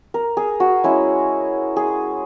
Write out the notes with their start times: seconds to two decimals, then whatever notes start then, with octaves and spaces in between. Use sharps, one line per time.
0.14 A#4
0.37 G#4
0.60 F#4
0.84 G#3 C#4 E4
1.76 G#4